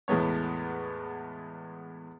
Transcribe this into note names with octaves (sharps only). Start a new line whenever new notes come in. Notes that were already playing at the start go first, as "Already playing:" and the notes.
E2 A2 G#3 B3 C#5